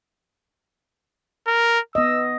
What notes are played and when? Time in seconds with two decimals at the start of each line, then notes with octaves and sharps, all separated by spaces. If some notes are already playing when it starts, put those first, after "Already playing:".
1.47 A#4
1.95 B3 D#5 E6